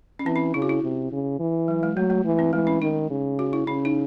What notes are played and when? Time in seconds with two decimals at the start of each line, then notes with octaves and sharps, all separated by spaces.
0.19 C#4
0.26 E3 C4
0.36 C#4
0.54 C#3 E4
0.62 F#4
0.69 E4
0.83 C3
1.12 C#3
1.39 E3
1.68 F#3
1.83 G#3
1.96 F#3 A3
2.10 A3
2.25 E3
2.39 C4
2.53 E3 G#3
2.67 C#4
2.81 D#3 D#4
3.10 C#3
3.39 F#4
3.53 E4
3.66 C#3 C#4
3.85 D#4